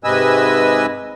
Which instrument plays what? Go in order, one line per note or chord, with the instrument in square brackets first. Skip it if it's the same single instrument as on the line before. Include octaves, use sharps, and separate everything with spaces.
[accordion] G#2 C3 B4 D#5 G#5 E6